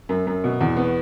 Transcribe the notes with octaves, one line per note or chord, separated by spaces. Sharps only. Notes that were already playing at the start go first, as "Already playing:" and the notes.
F#2
F#2
B2
E2
B3